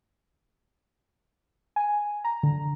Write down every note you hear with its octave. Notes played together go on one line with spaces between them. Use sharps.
G#5
A#5
D3